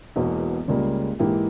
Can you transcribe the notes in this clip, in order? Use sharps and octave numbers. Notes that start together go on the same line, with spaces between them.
E1 E2 B2 A#3
C#2 C#3 G3 A#3
G#2 E3 A#3 E4 G4